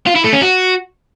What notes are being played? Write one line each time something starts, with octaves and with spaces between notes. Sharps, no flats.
F4
E4
A3
C#4
F#4